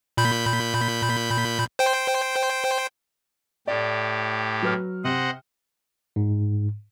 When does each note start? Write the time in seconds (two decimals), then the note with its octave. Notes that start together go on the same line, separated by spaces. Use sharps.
0.17 A#2 B5 G6
1.79 C5 G5
3.67 A2 G4 D5
4.62 F#3 B4 F6
5.04 C3 C5 D#5 F#5
6.16 G#2